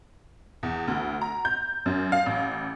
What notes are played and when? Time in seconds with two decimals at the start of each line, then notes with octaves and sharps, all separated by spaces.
0.63 E2
0.88 D2
1.21 A#5
1.45 G6
1.86 F#2
2.12 F5
2.26 A1